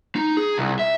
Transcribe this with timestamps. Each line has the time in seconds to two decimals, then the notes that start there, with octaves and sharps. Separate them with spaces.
0.16 D#4
0.37 G#4
0.58 C2
0.79 E5